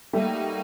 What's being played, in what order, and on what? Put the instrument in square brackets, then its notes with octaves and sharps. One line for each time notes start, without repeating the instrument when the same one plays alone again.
[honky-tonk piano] G3 A3 [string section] A#3 D#4 F#4